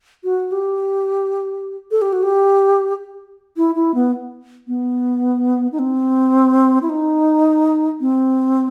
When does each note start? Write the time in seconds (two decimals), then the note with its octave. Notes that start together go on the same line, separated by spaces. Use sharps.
0.24 F#4
0.52 G4
1.91 A4
2.02 G4
2.13 F#4
2.23 G4
3.57 E4
3.75 E4
3.95 B3
4.68 B3
5.72 D#4
5.79 C4
6.82 E4
6.89 D#4
8.01 C4